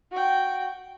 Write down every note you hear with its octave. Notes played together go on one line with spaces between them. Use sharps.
F#4 G5